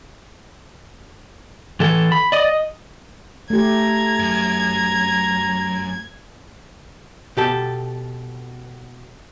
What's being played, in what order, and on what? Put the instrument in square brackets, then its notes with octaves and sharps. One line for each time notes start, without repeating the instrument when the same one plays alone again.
[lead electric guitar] E3 A4
B5
D5 D#5
D#5
[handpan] A3 G4 [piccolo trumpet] A#5 [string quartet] G#6
[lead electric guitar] F#2
[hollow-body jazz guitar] B2 G4 A4